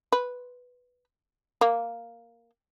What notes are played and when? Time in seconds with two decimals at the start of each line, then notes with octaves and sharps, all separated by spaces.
0.12 B4
1.61 A#3